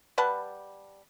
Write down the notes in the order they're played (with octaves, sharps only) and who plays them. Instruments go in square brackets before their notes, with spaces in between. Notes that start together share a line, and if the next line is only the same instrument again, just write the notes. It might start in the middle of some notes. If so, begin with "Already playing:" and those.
[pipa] G3 B4 F#5 A5